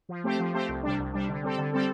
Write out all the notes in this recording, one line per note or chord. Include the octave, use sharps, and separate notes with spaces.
F3
A3 C4 G4 C5
F3
A3 C4 G4 C5
C2
C3 G3 D4
C2
C3 G3 D4
D3
G3 C4 A4
D3
G3 C4 A4